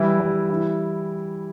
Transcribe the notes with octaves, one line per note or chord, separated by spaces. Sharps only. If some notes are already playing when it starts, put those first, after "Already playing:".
Already playing: E3 G3 E4
G3
E3